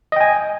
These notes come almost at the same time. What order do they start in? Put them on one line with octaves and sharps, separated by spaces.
D#5 G5 G#5